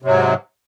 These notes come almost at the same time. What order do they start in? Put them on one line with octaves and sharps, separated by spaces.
C3 F#3 G#2